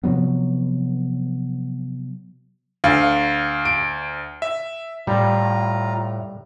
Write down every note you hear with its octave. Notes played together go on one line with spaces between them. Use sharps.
C3 F3 F#3 B3
D2 F5
D7
E5
A2 G3 F4 A#5